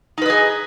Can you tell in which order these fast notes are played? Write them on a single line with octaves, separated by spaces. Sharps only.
D#4 B4 D#5 G#4